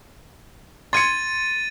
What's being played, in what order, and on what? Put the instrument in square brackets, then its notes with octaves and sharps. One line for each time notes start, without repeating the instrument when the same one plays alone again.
[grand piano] C6 G#6 C#7 [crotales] A6 D#7